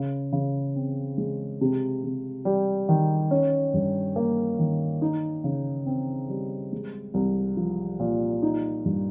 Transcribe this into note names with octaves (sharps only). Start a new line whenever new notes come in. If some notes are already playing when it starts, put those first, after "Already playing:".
Already playing: C#3
C#3
C4
G#3
C3
C3
G3
D#3
C#4
G2
A#3
D#3
D#4
C#3
C4
G3
G#3
C2
F3
A#2
D#4
G2